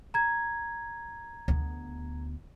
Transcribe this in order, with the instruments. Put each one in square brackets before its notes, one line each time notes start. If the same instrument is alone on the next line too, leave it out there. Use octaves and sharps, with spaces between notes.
[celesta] A#5 G#6
[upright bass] D2 B3